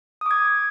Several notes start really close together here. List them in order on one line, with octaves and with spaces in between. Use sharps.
D#6 D6 G#6